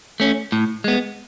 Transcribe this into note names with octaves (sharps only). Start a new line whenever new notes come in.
A3 C#4
A2
G#3 B3